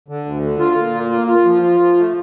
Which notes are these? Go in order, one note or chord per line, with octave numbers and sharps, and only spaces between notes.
D3
D2
D3
F4
A#2
A#3
F4
F4
F3
F4
F3
A3